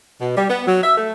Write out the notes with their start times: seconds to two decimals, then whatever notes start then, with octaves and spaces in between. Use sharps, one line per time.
0.21 B2
0.37 G3
0.49 B3
0.67 F#3
0.83 E5
0.97 A3